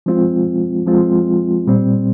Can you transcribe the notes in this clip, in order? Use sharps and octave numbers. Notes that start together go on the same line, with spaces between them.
F3 G#3 C4 F4
F3 G#3 C4 F4
A#2 G3 C4